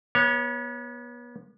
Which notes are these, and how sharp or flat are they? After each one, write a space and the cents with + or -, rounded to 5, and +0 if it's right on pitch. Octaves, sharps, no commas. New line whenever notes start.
B3 -35 C#5 +0